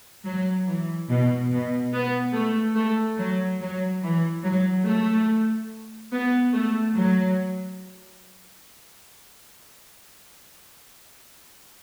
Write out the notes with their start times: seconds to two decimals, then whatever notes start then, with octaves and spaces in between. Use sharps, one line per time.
0.25 F#3
0.67 E3
1.09 B2
1.51 B2
1.93 B3
2.34 A3
2.76 A3
3.18 F#3
3.61 F#3
4.03 E3
4.44 F#3
4.86 A3
6.12 B3
6.53 A3
6.95 F#3